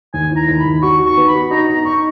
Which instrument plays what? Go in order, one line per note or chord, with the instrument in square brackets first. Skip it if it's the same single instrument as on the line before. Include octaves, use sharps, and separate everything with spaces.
[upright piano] D#2 [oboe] G#5
[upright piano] E3 [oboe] A#5
[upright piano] D#2
[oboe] B5
[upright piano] D#2
[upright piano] F#4 [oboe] C#6
[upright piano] D#3
[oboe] C#6
[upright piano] B3
[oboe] B5
[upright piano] F#4
[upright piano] D#4 [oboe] A#5
[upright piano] D#4 [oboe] A#5
[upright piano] D#4 [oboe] C#6